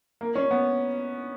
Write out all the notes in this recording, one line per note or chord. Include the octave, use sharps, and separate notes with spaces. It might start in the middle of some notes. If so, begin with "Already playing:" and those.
A#3
C#4
B3